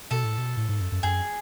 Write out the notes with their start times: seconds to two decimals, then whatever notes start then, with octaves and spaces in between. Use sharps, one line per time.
0.11 B2 A4
0.24 A2
0.38 B2
0.57 A2
0.69 G#2
0.81 F#2
0.92 F#2
1.03 F#2 G#4